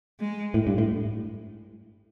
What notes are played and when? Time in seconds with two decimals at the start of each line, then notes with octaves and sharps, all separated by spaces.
0.20 G#3
0.54 A2
0.67 G2
0.78 A2